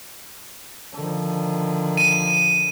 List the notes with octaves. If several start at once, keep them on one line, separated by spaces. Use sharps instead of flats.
D3 D#3 F3
D#7